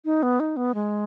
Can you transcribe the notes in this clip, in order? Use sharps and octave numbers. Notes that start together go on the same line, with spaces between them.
D#4
B3
D#4
B3
G#3